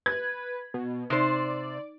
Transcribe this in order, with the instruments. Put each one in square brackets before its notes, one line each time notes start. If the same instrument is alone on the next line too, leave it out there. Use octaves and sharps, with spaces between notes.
[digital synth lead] B4 [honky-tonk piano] G#6
[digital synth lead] B2
[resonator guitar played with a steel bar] C3 C5 [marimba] D#4 [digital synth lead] D5